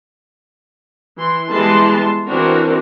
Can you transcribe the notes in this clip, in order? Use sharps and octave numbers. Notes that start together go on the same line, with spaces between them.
E3 C6
E3 G3 G#3 B3 A5 C6
E3 C4 D4 F#4 A#4